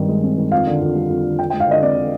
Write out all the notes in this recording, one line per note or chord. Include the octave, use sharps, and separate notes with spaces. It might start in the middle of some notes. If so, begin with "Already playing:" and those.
Already playing: G2 D#3 C4
G#3
C4
D#3
F2 F5
D3
F2
G3
F2
D3
D3 G5
G5
G#3
F5
D3 D#5
C4 D5
D3